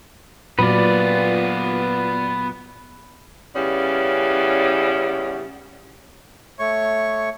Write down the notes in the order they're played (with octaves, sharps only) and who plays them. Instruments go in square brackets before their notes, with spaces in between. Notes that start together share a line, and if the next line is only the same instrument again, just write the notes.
[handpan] A#2 F#3 [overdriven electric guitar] B3 F4 [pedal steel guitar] B4 D5
[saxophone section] C#3 G3 B3 C#4 E4 D5
[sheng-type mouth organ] A3 C#5 C#6